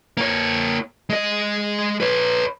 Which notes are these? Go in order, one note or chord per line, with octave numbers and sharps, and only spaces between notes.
A#3 C#5
G#3 D#5
B4 C#5